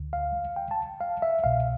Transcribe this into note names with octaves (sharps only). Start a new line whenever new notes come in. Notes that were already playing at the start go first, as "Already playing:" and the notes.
Already playing: D2 D3
F5
G5
A5
F5
E5
C2 B2 F5